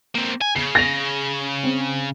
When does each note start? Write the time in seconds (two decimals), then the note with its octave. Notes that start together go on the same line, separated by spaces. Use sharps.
0.15 A#3 C4
0.41 G#5
0.56 C#3 C7
0.75 A#6 F7
1.63 C4